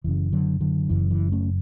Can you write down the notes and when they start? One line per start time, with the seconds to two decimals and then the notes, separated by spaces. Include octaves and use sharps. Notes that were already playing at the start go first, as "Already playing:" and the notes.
0.04 F#1 F#2 C#3 E3
0.33 D3 F#3
0.61 D3 F#3
0.89 F#1 F#2 C#3 E3
1.11 E3
1.32 A3 C#4